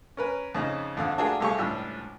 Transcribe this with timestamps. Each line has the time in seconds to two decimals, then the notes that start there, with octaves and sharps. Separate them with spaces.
0.17 C#4 A#4 B4
0.55 F2 C#3 D#4
0.96 G#1 F2 D3 F5
1.18 A3 D4 F4 F#4 G#4 A#4
1.40 C2 A3 G4 G#4 F5 C#6
1.58 C#2 A2 F3 G3 D4 E6